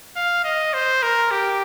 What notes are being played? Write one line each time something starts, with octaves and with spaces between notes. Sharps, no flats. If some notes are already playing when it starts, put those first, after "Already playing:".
F5
D#5
C5
A#4
G4